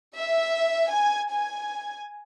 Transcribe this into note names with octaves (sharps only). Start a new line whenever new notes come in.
E5
G#5
G#5